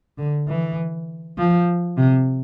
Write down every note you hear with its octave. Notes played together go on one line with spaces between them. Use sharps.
D3
E3
F3
C3